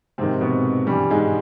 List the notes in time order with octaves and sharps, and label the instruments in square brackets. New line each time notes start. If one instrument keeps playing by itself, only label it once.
[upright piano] G#2 C3 D#3 C4
B2 B3
G2 E3 G3
G#2 G#3